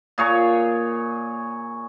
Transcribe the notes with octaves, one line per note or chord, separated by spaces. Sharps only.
A#2 G#4 C#5 A#5